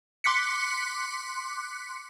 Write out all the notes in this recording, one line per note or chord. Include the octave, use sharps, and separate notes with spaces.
C6 D6 F#6 B6 C#7